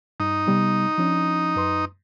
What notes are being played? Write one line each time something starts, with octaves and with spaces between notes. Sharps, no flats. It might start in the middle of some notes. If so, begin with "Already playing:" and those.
G2 D#4
C3 G3 B3
F3 C#4 D4
F#2 B4 C6